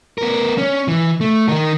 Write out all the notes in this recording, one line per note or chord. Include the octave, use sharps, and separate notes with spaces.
B3 A#4
C#4
E3
A3
D#3 A#4